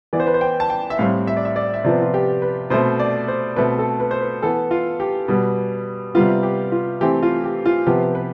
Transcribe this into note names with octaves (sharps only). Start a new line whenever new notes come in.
E3 B3 D5
C5
B4
C5
G5
A5
G5
E5
A2 G3 C4 F5
E5
D5
E5
D5
E5
C3 F3 B3 D5
F4
G4
B4
B2 A3 C4 C5
D5
C5
B2 A3 C4 B4
A4
B4
C5
B4
E3 B3 A4
F4
G4
B2 G3 B3
C3 G3 B3 F4
G4
F4
E3 A3 C4 G4
F4
G4
F4
C3 F3 B3 G4
B4